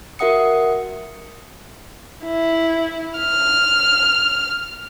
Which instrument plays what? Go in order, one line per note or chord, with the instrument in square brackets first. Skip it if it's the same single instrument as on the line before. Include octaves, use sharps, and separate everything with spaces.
[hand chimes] F#4 A#4 E5 F#5 D#6 C#7
[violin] E4
F6